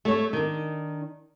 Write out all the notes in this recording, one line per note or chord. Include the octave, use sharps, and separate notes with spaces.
A3 C#5
D#3 D4